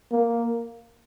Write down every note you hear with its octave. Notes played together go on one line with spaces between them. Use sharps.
A#3